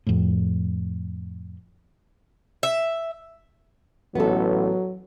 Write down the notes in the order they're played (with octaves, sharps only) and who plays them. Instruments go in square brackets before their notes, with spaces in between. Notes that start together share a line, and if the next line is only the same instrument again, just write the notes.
[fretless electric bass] F2 A2
[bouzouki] E5
[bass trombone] A1 [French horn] F#3 [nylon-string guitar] B3 A4